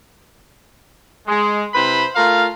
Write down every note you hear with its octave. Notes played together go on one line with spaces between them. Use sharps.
G#3
C3 E4 B4 C5 B5
A3 F4 A#4 F5